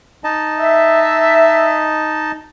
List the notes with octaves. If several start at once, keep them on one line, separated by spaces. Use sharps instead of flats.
D#4 D#5 A5
E5